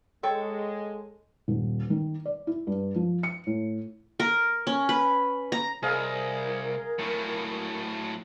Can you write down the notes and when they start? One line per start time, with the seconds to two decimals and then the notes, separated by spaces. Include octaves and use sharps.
0.23 G#3 A4 C#5 G5
1.48 D#1
1.90 D#3
2.25 D5
2.47 E4
2.67 G2
2.96 F3
3.23 C#7
3.47 A2
4.20 A#4
4.67 C#4
4.89 B4
5.52 A#5
5.83 C2 G#4 A#4 D#5 F5
6.99 A2 F#3